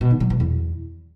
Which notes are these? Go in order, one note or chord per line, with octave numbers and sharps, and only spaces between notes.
B2
D#3
F#3
B2
E2